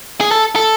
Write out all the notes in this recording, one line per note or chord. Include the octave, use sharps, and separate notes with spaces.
G#4
A4
A4